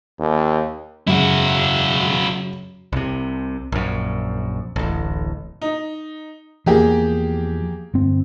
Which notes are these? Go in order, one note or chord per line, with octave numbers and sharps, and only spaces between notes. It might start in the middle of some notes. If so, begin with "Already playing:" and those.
D#2
F#2 C#3 E4 F#4
C2 C3
A#1 F#2
D1 A1
D#4
E2 F3 A#3 G4 G#4
G1 C4